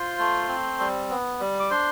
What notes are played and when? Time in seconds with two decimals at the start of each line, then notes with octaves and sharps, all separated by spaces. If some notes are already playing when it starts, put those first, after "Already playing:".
Already playing: F4 C5 C6
0.19 A3
0.48 C4
0.80 G3
1.10 B3
1.40 G3
1.60 D6
1.70 D4 C5 C6